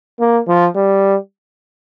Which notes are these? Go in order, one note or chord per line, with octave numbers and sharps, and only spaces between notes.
A#3
F3
G3